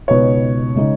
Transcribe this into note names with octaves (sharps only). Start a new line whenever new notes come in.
C#2 B2 B3 D#4 C#5
C#3 G#3 D#4